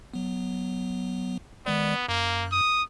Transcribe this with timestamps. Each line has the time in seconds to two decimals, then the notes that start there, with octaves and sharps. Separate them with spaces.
0.14 F#3 B3
1.66 D#3 G#3 B3 D5
2.09 F#2 A#3
2.52 D#6